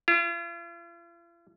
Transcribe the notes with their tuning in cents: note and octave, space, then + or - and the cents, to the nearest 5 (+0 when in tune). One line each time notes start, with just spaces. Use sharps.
F4 -45